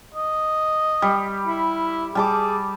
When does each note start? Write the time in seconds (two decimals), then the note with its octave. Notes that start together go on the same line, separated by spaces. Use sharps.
0.14 D#5
1.02 G3
1.48 E4
2.15 G3 G#4 A5 D6